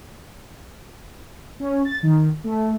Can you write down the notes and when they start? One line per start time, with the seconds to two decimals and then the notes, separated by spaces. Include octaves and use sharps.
1.60 C#4
1.85 A6
2.03 D#3
2.44 A3